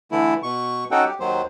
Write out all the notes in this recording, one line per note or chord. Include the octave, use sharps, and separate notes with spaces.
D3 E3 A3 E4
B2 C#6
C#4 D#4 F#4 A4 F#5 G5
G4
D#2 D#3 F#3 C5